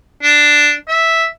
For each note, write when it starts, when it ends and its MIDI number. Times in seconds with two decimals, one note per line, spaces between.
0.23 0.73 62
0.88 1.26 76